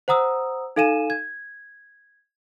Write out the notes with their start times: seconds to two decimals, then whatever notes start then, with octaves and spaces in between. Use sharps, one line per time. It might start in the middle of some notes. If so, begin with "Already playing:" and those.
0.08 C5 F#5 A#5 D#6 E6
0.76 D#4 A4 F5 G#5 D#7 E7
1.10 G#6